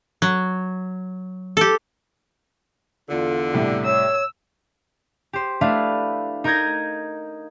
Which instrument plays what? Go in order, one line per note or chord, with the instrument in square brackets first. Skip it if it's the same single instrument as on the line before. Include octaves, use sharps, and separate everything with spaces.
[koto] F#3
G4 A4
[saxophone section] E2 D3 [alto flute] F4
[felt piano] A2 C3 G3
[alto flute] C#5 [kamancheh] E6
[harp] G4 C5
A3 D4 E4 B4 F5
D#4 A#4 D#6 G6 G#6 A#6